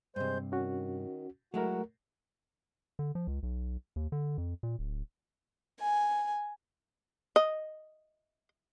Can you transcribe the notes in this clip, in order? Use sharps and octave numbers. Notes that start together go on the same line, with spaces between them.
G2 C3 G#3 C5 G6
D#3 C#4 F#4
F#3 G#3 A3 E4 F#4 A#4
D3
F3
C#2
B1
D#2
D3
F2
A#2
D1
G#5
D#5